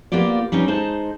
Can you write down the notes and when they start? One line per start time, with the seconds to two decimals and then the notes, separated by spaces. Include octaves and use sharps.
0.12 A#3 B3 F4 G4 D5
0.52 G3 B3 C#4 D#4
0.68 G#3 D#4 C5 A5